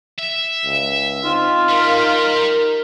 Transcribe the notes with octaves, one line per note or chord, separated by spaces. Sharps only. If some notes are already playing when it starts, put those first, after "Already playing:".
E5
C#2
C4 D#4 F4
G3 A#4